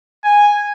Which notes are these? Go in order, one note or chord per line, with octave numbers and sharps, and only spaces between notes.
G#5